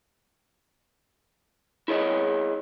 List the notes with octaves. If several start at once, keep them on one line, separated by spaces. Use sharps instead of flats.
E4 G#4 C#5 D#5